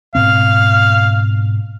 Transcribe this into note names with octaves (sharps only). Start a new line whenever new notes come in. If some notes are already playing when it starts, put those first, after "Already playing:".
G#2 B2 C4 F5